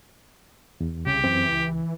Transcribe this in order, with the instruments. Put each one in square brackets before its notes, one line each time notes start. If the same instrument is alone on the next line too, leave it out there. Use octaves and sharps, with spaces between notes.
[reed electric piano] E2
[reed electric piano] C2 [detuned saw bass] C#3 [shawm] G4
[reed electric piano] F#2 C4 [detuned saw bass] E3
[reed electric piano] C#2